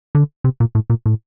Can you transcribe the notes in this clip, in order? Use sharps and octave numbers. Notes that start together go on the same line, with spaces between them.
D3
C3
A#2
A2
A#2
A2